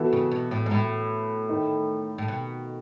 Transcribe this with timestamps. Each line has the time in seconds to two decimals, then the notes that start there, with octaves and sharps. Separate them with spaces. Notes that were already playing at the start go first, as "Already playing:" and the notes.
Already playing: E3 B3 F#4 A4
0.13 C#3
0.32 B2
0.51 A2
0.66 G#2
0.71 A2
1.49 D#3 A3 D#4
2.18 A2
2.28 B2